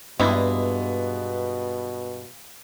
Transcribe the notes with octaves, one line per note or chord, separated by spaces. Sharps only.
G2 B2 G#3 A#3 B3 E4